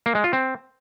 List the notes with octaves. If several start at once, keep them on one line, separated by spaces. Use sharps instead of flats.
A#3
G#3
F4
C4